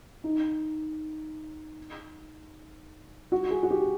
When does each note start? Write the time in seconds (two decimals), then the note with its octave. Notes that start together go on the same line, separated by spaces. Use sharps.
0.24 D#4
3.32 F#4
3.51 G#4
3.63 F#4
3.71 G4